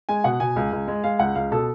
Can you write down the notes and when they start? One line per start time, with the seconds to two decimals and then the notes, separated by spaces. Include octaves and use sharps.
0.09 G#3 G#5
0.24 B2 F#5
0.40 B2 G#5
0.56 C#2
0.73 C#2
0.88 G#3
1.04 G#3 F5
1.19 C#2 F#5
1.35 C#2 F5
1.52 B2 A4